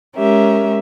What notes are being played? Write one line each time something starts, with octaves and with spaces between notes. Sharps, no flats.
G#3 C#4 G4 A#4 E5